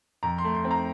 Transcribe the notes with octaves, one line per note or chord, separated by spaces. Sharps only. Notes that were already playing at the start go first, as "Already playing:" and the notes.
F2 A#5
C6
A3
C6
C4
A#5